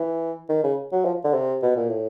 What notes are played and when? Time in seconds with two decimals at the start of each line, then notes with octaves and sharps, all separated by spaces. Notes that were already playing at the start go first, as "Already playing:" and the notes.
Already playing: E3
0.49 D#3
0.63 C#3
0.92 F#3
1.05 F3
1.24 D3
1.34 C3
1.62 B2
1.76 A#2
1.89 A2